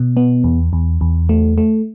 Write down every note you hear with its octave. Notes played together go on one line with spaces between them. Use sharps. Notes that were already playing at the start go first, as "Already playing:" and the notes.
Already playing: B2
B3
E2
E2
E2
A3
A3